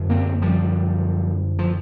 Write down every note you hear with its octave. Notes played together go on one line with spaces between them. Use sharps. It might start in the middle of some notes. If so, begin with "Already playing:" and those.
Already playing: F#2 D3
A#3 C4
F3 G3
F3